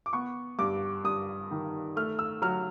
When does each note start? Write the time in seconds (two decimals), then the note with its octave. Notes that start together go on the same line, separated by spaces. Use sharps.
0.06 D6
0.13 B3 C#6
0.59 G2 D6
1.04 G2 D#6
1.51 D#3
1.96 A3 F6
2.19 E6
2.42 F#3 F6